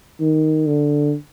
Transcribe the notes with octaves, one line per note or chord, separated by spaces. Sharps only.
D#3
D3